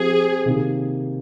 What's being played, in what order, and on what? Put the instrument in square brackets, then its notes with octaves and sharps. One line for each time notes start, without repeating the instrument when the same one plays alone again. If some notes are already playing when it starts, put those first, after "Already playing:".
Already playing: [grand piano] F3 C4 G4 [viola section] G#4
[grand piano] C3 D#3 A#3 D#4 G4